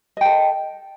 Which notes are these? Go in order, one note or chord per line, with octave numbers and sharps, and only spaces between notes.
A4 D#5 G5